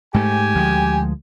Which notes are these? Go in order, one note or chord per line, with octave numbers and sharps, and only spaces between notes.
G#2 A3 G4 G#5
D2 F3 G#3